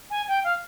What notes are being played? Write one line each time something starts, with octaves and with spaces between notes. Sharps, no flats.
G#5
G5
F5